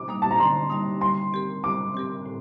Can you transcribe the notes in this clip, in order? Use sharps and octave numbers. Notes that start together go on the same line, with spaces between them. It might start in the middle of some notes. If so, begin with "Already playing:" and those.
Already playing: D6
G3 A#3 D#4
A5
A#5
D3 C6
G3 A#3 D#4
G3 C6
C4 G4 A#4
G3 D6
C4 G4 A#4
A2